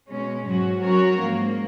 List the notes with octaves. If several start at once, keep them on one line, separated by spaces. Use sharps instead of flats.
B2 G#3 C#4
G#2 F#3 C#4 F#4
F#3 C#4 F#4 A#4 C#5
G#2 F3 A#3